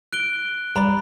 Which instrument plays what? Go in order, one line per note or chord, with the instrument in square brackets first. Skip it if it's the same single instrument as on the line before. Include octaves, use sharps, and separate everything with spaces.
[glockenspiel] F#6 D7 G7
[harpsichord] G2 D5 [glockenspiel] A#5 B5